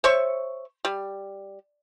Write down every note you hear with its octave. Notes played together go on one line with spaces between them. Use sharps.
C5 C#5 E5 C#6
G3